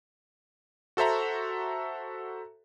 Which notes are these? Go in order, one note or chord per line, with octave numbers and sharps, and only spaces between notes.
F#4 A4 C5 E5 A#5